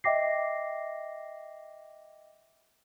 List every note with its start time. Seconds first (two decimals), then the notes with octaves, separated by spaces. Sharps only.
0.04 D#5 E5 G5 D6 A#6 C7